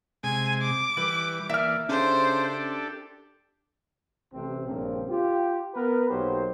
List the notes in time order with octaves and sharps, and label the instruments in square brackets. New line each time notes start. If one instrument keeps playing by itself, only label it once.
[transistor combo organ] C3 G#3 [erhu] G#5
[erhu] D6
[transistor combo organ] E3 G3 [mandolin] B4
[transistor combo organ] E3 A#3 D5 [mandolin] E5 F6
[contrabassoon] C#3 [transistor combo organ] D4 G4 A4 [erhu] C5
[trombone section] A1 C3 C4
A#1 G2 C#3 F3 A#3 C4
F4 G4
B3 A#4 B4
B1 F#3 A#3 D#4 G4 C5